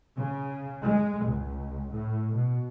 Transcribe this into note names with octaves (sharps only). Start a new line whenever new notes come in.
C#3
G#3
C#2
A2
B2